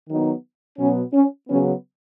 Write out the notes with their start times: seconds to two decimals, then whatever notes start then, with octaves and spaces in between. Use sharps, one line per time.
0.09 D#3 F#3 B3 D#4
0.79 B2 F#3 B3 C#4
1.14 C#4
1.49 C#3 F#3 B3 C#4